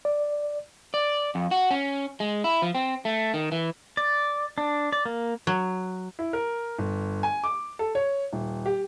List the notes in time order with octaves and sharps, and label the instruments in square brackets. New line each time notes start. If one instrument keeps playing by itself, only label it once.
[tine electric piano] D5
[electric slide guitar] D5
F2
F#4
C#4
G#3
E4
F3
C4
A3
D#3
E3
[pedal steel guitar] D5
D4
D5
A#3
[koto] F#3
[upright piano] E4
A#4
G1
G#5
D6
A4
C#5
D#1
G4